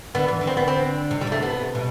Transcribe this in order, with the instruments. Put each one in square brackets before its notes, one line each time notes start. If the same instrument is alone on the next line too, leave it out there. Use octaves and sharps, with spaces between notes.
[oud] D3 [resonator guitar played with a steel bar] B3
[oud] E3
D3
[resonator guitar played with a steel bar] C4
B3
C4
[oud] C3
[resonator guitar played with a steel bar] G3
[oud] C3 [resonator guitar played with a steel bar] A3
[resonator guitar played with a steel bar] B3
[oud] B2